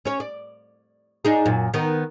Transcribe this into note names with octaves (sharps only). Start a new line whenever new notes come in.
C#4 C#5
D5
D4 D#4 G#4
F#2 A#2
D#3 B3